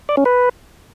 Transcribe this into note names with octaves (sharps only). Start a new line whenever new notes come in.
D5
C#4
B4